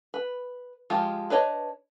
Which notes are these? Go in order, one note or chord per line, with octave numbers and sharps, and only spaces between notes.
B4
F3 G#3 F4 G4
D4 B4 C#5 D#5